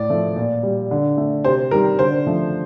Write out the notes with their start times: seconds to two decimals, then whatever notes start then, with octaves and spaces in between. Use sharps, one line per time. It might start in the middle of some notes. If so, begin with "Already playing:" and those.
Already playing: A2 D5
0.10 F3 A3
0.36 A#2
0.63 G3
0.91 D3
1.17 A3
1.44 C3 C5
1.71 D#3 G3 A#4
1.99 D3 C5
2.27 F3 A3